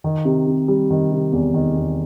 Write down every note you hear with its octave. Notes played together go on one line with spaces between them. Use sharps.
D#3
C3
C3
G3
D#3
C3
E2
D#3
E2